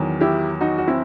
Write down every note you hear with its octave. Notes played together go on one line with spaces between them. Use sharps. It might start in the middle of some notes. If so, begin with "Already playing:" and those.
Already playing: E2 D#3 F#3
E4 G4
D#4 F#4
F#4
C4 E4